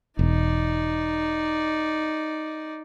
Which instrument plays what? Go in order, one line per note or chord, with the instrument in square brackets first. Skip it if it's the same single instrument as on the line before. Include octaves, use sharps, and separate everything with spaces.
[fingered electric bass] E1 [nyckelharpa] D#4 D5